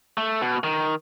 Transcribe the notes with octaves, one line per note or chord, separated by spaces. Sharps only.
A3
B2
D#3